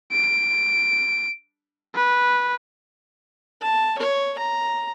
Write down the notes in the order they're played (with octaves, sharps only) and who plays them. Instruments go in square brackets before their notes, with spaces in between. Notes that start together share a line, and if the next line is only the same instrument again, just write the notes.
[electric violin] D7
B4
[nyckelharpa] A5
C#5
A#5